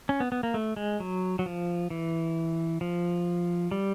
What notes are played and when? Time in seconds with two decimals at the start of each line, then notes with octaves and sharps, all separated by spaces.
0.09 C#4
0.20 B3
0.32 B3
0.43 A#3
0.54 A3
0.76 G#3
1.00 F#3
1.39 F#3
1.46 F3
1.90 E3
2.81 F3
3.71 G3